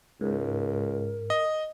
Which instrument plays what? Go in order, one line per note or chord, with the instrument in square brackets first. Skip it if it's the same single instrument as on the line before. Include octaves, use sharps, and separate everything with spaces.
[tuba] C#2 [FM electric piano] G#2 [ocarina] A#4
[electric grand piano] D#5